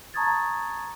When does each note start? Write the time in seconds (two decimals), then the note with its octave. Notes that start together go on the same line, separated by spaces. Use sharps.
0.14 A5 A#5 C#6 D#6 G#6 A6